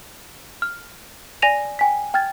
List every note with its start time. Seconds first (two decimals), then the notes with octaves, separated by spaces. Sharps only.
0.62 F6
1.42 D5 G#5 A#6 D#7 F7
1.79 G5 G#5 B6
2.14 G5 F6 G#6 A6